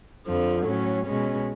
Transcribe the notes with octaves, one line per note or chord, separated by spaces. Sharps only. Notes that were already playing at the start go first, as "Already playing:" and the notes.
F2 D3 F3
A2 F#3 C#4
B2 G#3 C#4